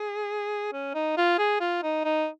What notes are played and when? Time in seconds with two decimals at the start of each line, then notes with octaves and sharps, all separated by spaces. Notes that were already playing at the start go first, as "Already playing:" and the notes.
Already playing: G#4
0.73 C#4
0.94 D#4
1.17 F4
1.38 G#4
1.60 F4
1.83 D#4
2.04 D#4